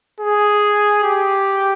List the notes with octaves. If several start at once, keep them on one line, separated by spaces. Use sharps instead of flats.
G#4
G4